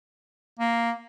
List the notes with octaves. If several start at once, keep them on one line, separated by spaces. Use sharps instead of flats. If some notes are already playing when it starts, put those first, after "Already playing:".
A#3